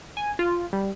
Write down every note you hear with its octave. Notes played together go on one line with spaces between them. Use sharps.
G#5
F4
G3